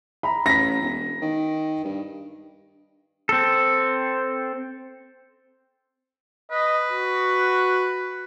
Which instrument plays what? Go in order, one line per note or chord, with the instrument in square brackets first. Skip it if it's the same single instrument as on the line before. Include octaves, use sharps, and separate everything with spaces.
[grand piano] A#5 B5
[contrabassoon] A1 [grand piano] A#6 B6
[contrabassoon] E1
D#3
G2
[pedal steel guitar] C4 A4
[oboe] B4 [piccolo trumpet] D#5
[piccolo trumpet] F#4